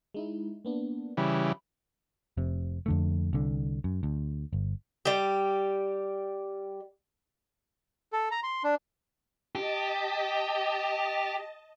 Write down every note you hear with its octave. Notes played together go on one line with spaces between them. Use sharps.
G#3 D#4 E4
A#3 B3 D4
C#3 E3 G3 B5
F1 C3
F2 D3 A3
C2 D3
F#2
D2
G1
G3 G4
A4
A#5
C6
D4
G4 D#5 A5